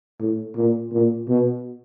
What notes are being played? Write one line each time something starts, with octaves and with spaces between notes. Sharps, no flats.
A2
A#2
A#2
B2